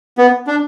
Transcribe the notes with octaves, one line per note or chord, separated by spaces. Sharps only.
B3
D4